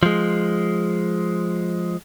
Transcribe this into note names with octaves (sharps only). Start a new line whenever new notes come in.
F3 G#3